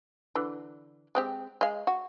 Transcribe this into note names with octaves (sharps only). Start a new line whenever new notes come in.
D3 E3
G#3 C4 G4
G#3 F5
F#4